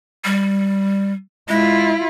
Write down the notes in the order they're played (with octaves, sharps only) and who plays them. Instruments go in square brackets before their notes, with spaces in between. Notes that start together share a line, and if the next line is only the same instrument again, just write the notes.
[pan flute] G3
[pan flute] G#3 [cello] E4 F4